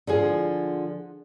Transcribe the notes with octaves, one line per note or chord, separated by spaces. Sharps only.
D3 F3 G#4